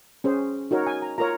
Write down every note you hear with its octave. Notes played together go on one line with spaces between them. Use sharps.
C#4 G#4 C5
D#4 F#4 A#4 C#5
G#5
A#5
F4 A#4 C#5 A#5